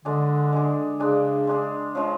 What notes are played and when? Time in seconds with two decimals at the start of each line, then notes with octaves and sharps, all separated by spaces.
0.05 D3 G#3 D4 G#4
0.53 G#3 D4 G#4
1.00 C#3 G#3 D4 G#4
1.47 G#3 D4 G#4
1.95 C#3 F3 G#3